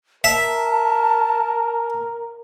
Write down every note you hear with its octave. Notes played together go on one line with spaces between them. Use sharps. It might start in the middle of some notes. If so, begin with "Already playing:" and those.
A#4 E5 A5